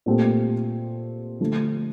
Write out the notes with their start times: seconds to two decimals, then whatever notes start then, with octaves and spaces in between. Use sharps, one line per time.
0.06 A#2 A3 C4 G4
1.40 D3 F3 A3